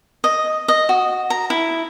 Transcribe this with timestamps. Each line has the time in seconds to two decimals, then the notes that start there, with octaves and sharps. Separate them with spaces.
0.24 D#5
0.68 D#5
0.89 F#4
1.30 A#5
1.50 E4